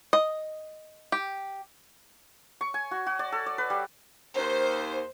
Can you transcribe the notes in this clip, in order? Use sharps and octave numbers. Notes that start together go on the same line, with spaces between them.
D#5
G4
C#6
G#5
F#4
F#4
D5
A4
D5
B4
G3
D#2 C5